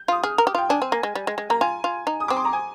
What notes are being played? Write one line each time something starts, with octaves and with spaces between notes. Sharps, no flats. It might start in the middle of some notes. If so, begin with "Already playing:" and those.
Already playing: G6
F4 D#6
G#4 F6
A#4
G4
F4 G5
D4 G#5
C4
A#3
G#3
G3
G#3
G#3
A#3 A#5
F4 G#5
F4
D#4
D#6
C4 D6
C6
A#5
G#5